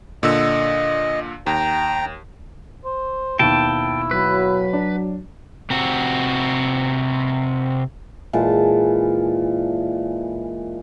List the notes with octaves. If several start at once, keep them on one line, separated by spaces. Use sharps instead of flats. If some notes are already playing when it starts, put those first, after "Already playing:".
A#2 D3 D#5 E6
D#2 G5 A#5
C5
D#2 B2 E4 G5 A5
F#3 B4
D4
C3 C4 F#4
A#2 E3 G#3 A5